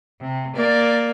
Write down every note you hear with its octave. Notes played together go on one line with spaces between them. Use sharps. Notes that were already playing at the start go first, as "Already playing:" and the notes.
C3
A#3 D5